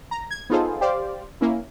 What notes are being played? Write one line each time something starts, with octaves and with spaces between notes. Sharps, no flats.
A#5
G#6
B3 D#4 F4 G#4 A4 C5
G4 C5 D5 F5
A#3 C#4 E4